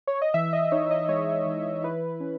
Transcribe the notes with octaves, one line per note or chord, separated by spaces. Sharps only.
C#5
D#5
E3 E5
D#5
D#4 C#5
D#5
G#3 C#5
E3
E4 B4
C#4